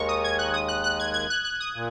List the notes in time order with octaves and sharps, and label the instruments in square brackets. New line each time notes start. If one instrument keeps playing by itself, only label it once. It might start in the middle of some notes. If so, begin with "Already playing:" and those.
Already playing: [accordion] D#2 D#3 G#3 [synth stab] A#5 C#6
[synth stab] D#6
G#6
F#6
D#6
F#6
F#6
G#6
G#6
F#6
F#6
D#6
[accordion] A#2